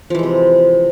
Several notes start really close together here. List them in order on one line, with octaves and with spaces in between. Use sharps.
F3 E3 G#3 C3